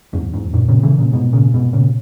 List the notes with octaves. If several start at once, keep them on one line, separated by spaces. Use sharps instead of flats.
E2 G#2
E2 G#2
F#2 A#2
A#2 C#3
C#3 E3
A#2 C#3
G#2 B2
A#2 C#3
G#2 B2
A#2 C#3